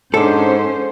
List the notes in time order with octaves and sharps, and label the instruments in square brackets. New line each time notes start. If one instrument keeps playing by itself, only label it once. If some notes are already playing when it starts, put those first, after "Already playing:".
[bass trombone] G#2 [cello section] C#4 C5 [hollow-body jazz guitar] D4 A4